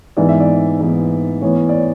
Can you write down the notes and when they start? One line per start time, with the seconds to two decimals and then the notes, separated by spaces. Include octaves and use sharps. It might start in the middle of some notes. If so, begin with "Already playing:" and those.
0.17 G#2 E3 B3 D5
0.29 E5
0.40 D5
0.80 G#2 E3 B3
1.42 A2 E3 B3 C#5
1.69 D5
1.74 C#5